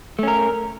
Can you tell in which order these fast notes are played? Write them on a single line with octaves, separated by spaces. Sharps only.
A3 C#4 A#4